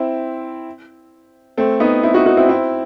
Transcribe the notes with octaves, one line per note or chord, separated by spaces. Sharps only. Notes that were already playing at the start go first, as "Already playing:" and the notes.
Already playing: C4 E4
A3 C4
B3 D#4
C4 E4
D#4 F#4
D#4 F#4
C4 E4
C4 E4